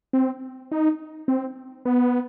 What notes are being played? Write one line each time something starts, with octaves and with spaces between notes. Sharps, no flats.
C4
D#4
C4
B3